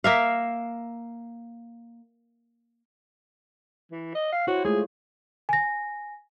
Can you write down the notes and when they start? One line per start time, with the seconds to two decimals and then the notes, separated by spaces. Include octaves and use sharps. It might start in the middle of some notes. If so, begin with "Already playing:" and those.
0.04 A#3 E5 F5
3.91 E3
4.15 D#5
4.32 F5
4.47 E4 F#4 C5 C#5
4.65 G#3 A3 F4 G#4
5.49 G#5 A#6